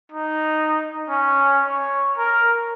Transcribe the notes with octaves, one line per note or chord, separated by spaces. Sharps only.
D#4
C#4
C#5
A#4